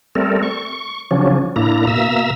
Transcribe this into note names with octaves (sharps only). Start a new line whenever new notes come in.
G3 A3 C4 A4 A#4
C#6
C#3 F3 F#3 C#4 D4
A2 A#3 D4 E4 A#5
B2 A#3 E5 A#5 E6